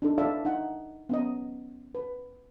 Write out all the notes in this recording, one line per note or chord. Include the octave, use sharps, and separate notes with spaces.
D4 D#4 A4
E4 A4 D5 E5 F5
D#4 F#5
B3 C#4 D#5
B4